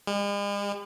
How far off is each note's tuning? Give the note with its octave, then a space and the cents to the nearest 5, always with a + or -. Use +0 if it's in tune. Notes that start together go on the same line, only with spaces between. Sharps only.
G#3 -45